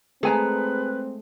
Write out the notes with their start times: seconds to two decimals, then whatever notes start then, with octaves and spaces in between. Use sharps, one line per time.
0.23 G#3 A3 C4 G#4 B4 G#5 A#5